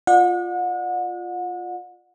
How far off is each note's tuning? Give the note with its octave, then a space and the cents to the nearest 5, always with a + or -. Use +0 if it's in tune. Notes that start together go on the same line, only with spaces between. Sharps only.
F4 +0 D5 +35 F#5 -35